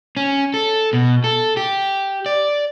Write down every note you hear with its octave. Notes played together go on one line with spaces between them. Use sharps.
C#4
A4
B2
A4
G4
D5